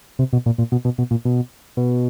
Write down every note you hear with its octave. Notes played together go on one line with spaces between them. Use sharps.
C3
B2
A#2
A#2
B2
B2
B2
A#2
B2
B2